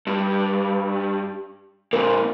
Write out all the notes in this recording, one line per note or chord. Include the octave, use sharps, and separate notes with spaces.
G2
F2 A#2 A#4